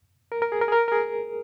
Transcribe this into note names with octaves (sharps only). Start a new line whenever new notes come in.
A#4
A#4
G#4
A#4
G#4
A#4
A#4
G#4